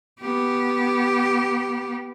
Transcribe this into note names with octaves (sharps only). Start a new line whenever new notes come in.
B3 G4